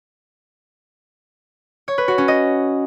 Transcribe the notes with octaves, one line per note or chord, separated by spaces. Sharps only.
C#5
B4
F#4
C#4
D#5